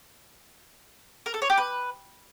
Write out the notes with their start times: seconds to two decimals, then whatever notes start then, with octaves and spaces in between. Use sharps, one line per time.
1.26 A#4
1.34 A4
1.42 C#5
1.50 G4
1.58 B4